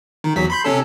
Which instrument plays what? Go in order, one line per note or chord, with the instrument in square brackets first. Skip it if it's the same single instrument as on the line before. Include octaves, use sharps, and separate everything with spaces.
[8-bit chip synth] D#3
E2 F#3 B6
B5 C6 G6
C3 C#4 A4